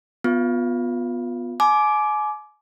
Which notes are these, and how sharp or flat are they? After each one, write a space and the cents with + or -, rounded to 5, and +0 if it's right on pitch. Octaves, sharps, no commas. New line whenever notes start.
B3 +0 F4 +25
G#5 +35 B5 +0 D6 +0